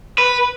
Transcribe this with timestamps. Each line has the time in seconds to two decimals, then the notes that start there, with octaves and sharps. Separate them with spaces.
0.18 B4